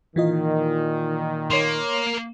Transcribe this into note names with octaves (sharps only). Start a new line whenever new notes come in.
A#2 D#3 E3 F4 D#5
A#3 C#5 C6